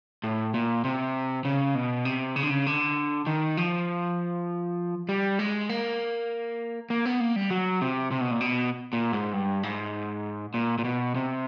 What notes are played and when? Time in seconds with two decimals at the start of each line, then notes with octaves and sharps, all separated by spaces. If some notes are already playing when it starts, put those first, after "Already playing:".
0.24 A2
0.54 A#2
0.84 C3
1.45 C#3
1.75 B2
2.05 C3
2.36 C#3
2.43 D3
2.50 C#3
2.67 D3
3.27 D#3
3.57 F3
5.09 G3
5.39 G#3
5.69 A#3
6.90 A#3
7.06 B3
7.20 A#3
7.36 G3
7.50 F#3
7.81 C3
8.11 C3
8.21 B2
8.31 A#2
8.41 B2
8.93 A#2
9.13 G#2
9.33 G2
9.63 G#2
10.54 A#2
10.78 A#2
10.84 B2
11.15 C3